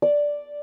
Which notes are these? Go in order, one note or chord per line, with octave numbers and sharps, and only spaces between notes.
D5